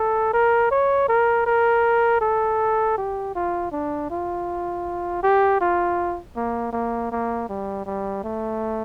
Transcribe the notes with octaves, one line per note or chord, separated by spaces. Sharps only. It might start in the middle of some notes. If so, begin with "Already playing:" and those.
Already playing: A4
A#4
C#5
A#4
A#4
A4
G4
F4
D4
F4
G4
F4
A#3
A#3
A#3
G3
G3
A3